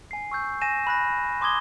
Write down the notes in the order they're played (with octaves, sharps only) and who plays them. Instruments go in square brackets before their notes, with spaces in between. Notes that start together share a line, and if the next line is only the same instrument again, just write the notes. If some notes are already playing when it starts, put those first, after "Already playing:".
[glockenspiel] G#5 C7
C#6 E6 G6
G#5 A#6 D#7 E7
B5 F#6 A#6
C6 D6 D#6 G#6 G7